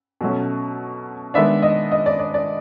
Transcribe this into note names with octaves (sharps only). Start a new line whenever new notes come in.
B2 F#3 A3 C#4
D#3 G#3 B3 D4 E5
D#5
D#5
D5
D5
D5